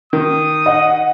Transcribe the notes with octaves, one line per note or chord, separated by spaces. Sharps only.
D#3 D#6
D#5 F#5